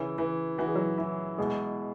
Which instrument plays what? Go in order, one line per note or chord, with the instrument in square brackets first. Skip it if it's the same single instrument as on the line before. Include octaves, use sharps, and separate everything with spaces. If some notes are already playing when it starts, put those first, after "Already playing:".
Already playing: [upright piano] C#3 C#4 [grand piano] E3
[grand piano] E3
[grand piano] E3 [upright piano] F#4
[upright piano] G#4
F#3 F#4
[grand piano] E3
[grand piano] B2 [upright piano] G#3 G#4